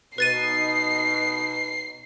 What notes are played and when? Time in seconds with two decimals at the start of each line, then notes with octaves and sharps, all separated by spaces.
0.18 B2 D#4 B4 A6 C7 D#7